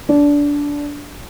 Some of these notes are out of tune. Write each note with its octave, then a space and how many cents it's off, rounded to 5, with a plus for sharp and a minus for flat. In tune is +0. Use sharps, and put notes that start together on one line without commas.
D4 -20